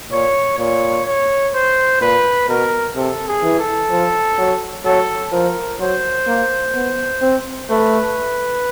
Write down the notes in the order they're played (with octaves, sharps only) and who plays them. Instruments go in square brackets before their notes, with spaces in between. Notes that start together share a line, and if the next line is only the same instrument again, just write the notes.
[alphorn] A#2 [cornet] C#5
[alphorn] A#2 [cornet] C#5
[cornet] C#5
C5
[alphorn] A#2 [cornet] B4
[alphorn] B2 [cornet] A#4
[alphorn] C3 [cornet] A4
[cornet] G#4
[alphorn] E3
[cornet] A4
[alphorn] F3
F#3
[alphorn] F#3 [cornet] A4
[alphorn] F3 [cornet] A#4
[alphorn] F#3 [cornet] C5
[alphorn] A#3
B3
C4
[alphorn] A3 [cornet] B4